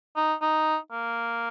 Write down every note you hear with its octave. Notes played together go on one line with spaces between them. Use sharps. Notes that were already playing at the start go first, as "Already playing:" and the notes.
D#4
D#4
A#3